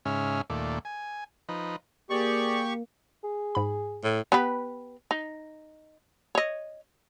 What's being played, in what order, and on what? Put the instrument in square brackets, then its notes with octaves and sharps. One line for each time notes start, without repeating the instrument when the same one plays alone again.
[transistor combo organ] G#2 C#3 C#4 E5 F6
D#2 A#2 A3 D5
G#5
F3 D#4 B4
[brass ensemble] A#3 [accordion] G4 C#6 [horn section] G#4 D5
[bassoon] G#4
[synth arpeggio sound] G#2 B5
[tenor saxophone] A2
[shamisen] B3 G4 B4
D#4
C#5 D#5